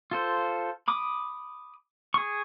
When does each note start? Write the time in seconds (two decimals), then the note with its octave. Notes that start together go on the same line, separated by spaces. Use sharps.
0.11 F4 A4 C5
0.88 B5 D6 D#6
2.14 G#4 C#6